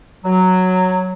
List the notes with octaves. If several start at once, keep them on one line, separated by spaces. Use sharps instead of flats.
F#3